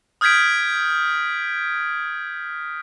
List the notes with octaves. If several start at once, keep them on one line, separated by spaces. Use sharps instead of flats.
D#6 F6 G6 G#6 B6 D7